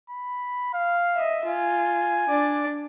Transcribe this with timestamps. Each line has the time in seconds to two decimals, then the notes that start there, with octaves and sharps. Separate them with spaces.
0.10 B5
0.74 F5
1.15 D#5 E5
1.45 F4 G#5
2.29 D4 D5